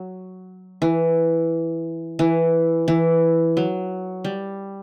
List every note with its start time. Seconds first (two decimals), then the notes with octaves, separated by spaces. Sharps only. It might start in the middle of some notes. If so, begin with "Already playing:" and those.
Already playing: F#3
0.82 E3
2.19 E3
2.88 E3
3.57 F#3
4.24 G3